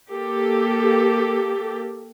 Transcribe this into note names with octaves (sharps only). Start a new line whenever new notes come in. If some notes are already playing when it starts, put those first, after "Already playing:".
A#3 G4 A4